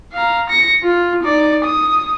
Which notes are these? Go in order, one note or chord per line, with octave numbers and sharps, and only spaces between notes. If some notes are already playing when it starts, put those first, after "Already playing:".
F5 A#5
A#6 C#7
F4
D#4 D5
D#6